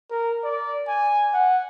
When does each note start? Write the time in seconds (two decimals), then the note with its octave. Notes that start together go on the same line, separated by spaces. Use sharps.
0.11 A#4
0.44 D5
0.88 G#5
1.34 F#5